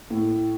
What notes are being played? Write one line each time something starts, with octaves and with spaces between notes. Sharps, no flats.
A2